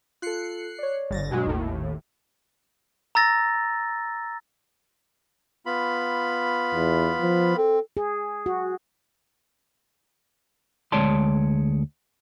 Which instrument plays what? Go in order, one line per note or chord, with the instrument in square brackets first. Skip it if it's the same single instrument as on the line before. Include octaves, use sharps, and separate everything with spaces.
[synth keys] F4 A4 [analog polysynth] F#6 C7 C#7
[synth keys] C#5 D5
[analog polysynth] G1 A6 A#6
[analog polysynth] G2 F#3 G#3 [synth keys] B2 F#4
[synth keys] G#1 [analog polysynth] D#2 A2
[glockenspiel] A#5 E6 A6 A#6
[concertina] B3 F4 B5
[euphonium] E2
F3
[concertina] C4 [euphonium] A4
[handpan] G#4
F#4
[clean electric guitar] D2 G#3 C#5 D5 A5 C6